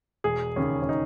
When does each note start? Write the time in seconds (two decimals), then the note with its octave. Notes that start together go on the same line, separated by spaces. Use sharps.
0.24 E1 G#4
0.56 D#2 C#3 C#4
0.82 C#4
0.89 D#4